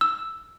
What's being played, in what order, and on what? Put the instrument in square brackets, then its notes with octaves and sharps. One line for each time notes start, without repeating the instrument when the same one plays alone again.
[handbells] E6